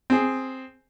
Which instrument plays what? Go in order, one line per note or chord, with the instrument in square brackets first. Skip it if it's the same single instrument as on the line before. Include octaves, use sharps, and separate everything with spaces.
[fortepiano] C4 G#4